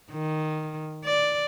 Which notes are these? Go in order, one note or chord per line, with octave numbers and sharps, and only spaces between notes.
D#3
D5